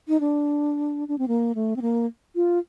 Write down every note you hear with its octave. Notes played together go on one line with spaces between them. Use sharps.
D#4
D4
D4
C4
A#3
A3
C4
A#3
F4